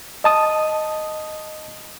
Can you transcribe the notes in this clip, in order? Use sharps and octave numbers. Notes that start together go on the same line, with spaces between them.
D#5 A5 D#6